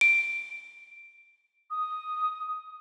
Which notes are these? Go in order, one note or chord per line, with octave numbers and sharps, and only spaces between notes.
D7
D#6